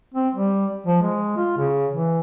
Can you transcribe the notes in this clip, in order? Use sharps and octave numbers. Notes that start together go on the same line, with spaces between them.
C4
G3
F3
G#3
F4
C#3
E3